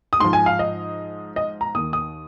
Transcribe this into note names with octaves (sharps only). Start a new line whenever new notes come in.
D#6
G#2 F3 C6
G#5
F5
D#5
D#5
A#5
D#2 D#3 D#6
D#6